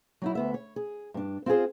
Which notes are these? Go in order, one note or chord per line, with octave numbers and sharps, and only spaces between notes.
F#3 D#4 E4
D2 B3 E5
C#5
G#4
G2 D4
C4 F4 G4 G#4 C5